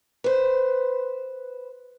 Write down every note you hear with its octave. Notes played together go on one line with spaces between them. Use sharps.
B4 C5